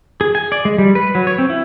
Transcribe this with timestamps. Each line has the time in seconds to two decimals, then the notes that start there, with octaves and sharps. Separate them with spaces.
0.21 G#4
0.35 G#5
0.52 D5
0.65 G#3
0.78 G3
0.95 B4
1.15 F#3
1.27 C#5
1.39 C4
1.50 E4